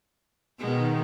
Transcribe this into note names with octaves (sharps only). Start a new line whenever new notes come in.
B2 D#3 G#3 B3